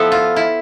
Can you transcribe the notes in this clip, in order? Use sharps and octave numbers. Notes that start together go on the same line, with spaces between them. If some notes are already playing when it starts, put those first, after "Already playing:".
Already playing: F3 B3 E4 A4
F4
E4